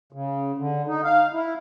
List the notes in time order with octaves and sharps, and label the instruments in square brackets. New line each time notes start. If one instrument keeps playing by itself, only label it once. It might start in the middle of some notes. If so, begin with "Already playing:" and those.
[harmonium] C#3
D3
D#4
F5
E4